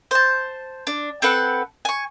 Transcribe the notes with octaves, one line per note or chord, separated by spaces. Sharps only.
C5 A5
D4
C4 A4 B4 F#5
G#5 C#6